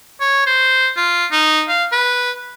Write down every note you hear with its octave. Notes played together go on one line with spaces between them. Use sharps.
C#5
C5
F4
D#4
F5
B4